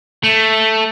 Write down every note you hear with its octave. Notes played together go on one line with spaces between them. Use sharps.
A3